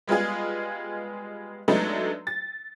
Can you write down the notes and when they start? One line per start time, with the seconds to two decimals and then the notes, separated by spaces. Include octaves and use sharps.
0.07 G3 G#3 B3 F4 G#4
1.68 F#3 G#3 A3 B3 D4 D#4
2.27 A6